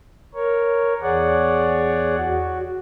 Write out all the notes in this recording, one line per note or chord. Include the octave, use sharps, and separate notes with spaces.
A#4 C#5
E2 G#4 C#5 D5 F#5
F#4